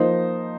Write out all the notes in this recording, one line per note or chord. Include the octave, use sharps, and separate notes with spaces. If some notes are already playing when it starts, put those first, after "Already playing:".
Already playing: F3 A#3 D#4 C5